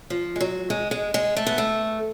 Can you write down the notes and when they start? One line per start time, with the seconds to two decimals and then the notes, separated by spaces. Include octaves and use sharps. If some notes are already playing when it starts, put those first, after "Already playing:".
0.10 F3
0.36 G#3
0.41 F#3
0.70 G#3
0.91 G#3
1.14 G#3
1.37 A3
1.47 B3
1.58 A3